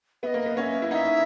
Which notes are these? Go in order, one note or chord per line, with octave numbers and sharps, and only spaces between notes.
B3 D#5 E5
A#3
B3
C#4 E5 F#5
E4
D#4 E5 F#5